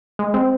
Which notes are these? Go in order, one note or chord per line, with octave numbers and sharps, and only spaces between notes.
G#3
C4